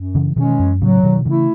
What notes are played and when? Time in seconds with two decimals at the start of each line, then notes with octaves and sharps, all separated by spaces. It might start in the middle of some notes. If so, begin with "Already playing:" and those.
Already playing: F#2
0.15 C#3 E3
0.36 B2 D#3 E3 G#3 C#4
0.59 F#2
0.81 A2 C#3 F#3
1.03 B2 D#3
1.18 F#3
1.25 C#3 E3 A3 E4